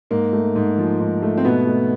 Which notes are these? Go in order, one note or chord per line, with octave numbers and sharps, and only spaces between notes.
G#2 A#3
A3
G#2
F3
G#2
A3
C4
B2 B3
A3